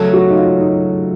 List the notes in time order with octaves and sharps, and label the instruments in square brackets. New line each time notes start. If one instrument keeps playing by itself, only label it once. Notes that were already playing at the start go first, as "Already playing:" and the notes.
Already playing: [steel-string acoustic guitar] C#3 F#3 A3 [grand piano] A4
[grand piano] F#4
D#4
F4
D#4